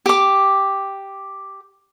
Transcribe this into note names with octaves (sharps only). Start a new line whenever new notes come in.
G4 D6